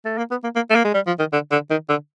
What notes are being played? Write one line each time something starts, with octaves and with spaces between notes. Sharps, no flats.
A3
A#3
B3
A#3
A#3
A3
A#3
G#3
G3
F3
D#3
D3
D3
D#3
D3